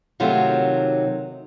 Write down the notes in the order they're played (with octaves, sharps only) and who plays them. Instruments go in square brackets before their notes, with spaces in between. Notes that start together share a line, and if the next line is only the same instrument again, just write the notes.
[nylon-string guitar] C3 D#3 F#3 A3 F4